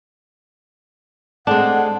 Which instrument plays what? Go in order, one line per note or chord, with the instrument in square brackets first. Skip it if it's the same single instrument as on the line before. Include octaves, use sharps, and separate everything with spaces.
[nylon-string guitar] G#3 A3 C4 [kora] D4 [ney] F#5